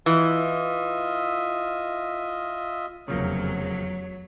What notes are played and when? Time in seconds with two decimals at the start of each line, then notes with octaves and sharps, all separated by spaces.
0.06 E3 F4 D#5 E5
3.08 F1 E2 C#3 F3 F#3 A#3 C#5